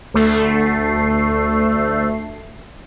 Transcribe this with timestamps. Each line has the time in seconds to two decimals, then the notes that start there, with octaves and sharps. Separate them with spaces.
0.14 D2 A3 C7